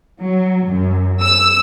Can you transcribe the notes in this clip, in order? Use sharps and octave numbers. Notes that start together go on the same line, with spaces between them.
F#3
F#2
E6